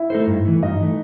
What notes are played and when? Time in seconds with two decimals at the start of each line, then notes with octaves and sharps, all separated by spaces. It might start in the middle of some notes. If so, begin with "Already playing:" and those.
Already playing: E4 E5
0.10 A3 D#4 A4 C5
0.27 G2
0.45 E3 A3
0.62 G2 D#4 D#5
0.80 E3 A3